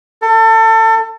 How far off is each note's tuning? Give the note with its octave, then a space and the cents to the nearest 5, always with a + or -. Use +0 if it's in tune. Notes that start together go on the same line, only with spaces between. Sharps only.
A4 +30